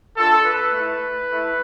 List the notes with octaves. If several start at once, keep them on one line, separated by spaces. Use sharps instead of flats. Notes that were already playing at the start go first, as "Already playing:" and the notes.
A3 D4 F4 A4
B4
A3 E4
A3 E4